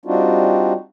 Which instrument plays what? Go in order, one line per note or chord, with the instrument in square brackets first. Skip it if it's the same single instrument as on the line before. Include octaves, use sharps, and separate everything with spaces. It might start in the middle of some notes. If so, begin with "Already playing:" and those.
[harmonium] G3 C4 D4 D#4 F4 F#4